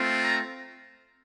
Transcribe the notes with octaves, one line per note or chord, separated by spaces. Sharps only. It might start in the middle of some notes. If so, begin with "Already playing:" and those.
Already playing: A3 C4 F4
A#5